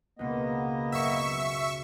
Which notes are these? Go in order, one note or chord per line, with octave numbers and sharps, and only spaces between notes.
C#2 B2 G#3 A#3 B3 D#5
F#2 E5 C#6